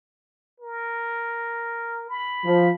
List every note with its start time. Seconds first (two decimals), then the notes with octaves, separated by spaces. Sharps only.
0.60 A#4
2.09 B5
2.45 F3